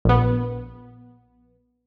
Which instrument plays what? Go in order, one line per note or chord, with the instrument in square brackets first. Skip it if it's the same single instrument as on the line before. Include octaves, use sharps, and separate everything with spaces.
[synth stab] A#1 B3